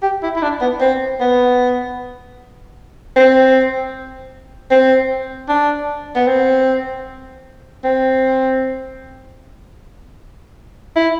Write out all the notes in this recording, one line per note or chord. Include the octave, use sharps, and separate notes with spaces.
G4
E4
E4
D4
B3
C4
B3
C4
C4
D4
B3
C4
C4
E4